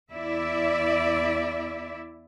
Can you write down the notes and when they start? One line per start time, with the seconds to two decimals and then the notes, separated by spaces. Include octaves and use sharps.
0.12 E2 E4 D5 E5